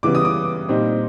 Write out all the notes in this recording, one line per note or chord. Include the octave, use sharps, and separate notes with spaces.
C#3 E3 G3 B3 D6
D#6
D6
A#2 G3 C4 D#4